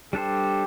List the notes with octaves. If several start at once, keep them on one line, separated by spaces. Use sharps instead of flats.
G3 D4 G4 A4 C5